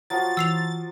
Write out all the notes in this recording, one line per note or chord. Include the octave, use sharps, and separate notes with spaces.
F3 F#3 A6
E3 E6 C7 F7